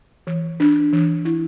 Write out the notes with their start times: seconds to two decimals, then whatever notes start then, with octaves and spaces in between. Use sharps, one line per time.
0.27 E3
0.60 D4
0.93 E3
1.25 E4